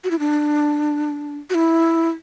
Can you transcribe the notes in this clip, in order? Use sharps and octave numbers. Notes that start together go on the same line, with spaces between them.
F#4
E4
D4
F#4
E4